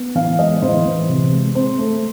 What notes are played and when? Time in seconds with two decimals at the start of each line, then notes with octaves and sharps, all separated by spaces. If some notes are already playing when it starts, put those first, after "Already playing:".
Already playing: B3
0.15 E3 F5
0.39 G#3 D#5
0.62 E3 C5
0.85 E3
1.09 C3
1.32 G#3
1.55 C4 C5
1.79 A3